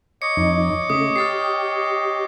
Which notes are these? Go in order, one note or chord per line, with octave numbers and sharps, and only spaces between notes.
C#5 D#5 D6 C#7
F2 D#4
C#3 A3 D#6
G4 F6 A6 C7